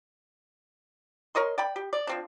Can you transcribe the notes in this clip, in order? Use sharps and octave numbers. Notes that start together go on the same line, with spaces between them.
A#4 C#5 D#5 C6
D5 G5 B5
G4
D5
F3 C4 D4